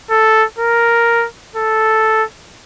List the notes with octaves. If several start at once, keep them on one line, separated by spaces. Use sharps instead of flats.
A4
A#4
A4